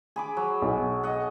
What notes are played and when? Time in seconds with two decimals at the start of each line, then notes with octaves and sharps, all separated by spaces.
0.16 G#4 B5 D6
0.37 F#3
0.62 B1
1.03 D#5 F#5